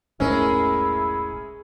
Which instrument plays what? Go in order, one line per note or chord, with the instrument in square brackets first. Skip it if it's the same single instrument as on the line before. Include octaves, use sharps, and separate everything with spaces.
[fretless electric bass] E1 B1 A2 [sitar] G#3 [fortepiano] C#4 A#4 [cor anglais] E4